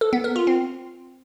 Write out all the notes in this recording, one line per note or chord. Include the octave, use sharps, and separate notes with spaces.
A4
B3
A#4
F4
C4